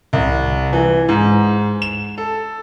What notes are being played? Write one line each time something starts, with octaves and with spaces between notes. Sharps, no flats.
C2
E3
G#2
E7
A4